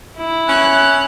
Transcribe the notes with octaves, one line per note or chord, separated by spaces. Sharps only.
E4
C#4 F#6